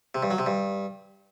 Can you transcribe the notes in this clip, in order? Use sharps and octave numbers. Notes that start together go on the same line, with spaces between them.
C3
G2
F#3
C3
G2